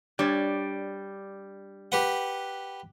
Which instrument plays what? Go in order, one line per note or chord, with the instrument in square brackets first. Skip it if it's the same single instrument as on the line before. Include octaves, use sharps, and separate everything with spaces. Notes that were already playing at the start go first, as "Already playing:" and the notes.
[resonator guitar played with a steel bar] G3 [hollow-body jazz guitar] D4 C#5
[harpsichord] G4 B4 F#5